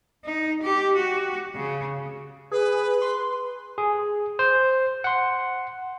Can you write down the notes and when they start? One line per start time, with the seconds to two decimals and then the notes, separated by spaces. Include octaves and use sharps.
0.25 D#4
0.62 G4
0.97 F#4
1.56 C#3
2.51 G#4 B4
3.02 C6
3.78 G#4
4.39 C5
5.04 F#5 C6